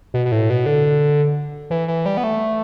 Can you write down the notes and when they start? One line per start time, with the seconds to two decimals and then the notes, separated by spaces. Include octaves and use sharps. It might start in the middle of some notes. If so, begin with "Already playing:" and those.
0.14 B2
0.25 B2
0.32 A2
0.50 B2
0.66 D3
1.70 E3
1.88 E3
2.06 G3
2.17 B3
2.24 A3